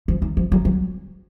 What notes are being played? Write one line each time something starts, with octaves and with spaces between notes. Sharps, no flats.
F3
D#3
F3
F#3
F#3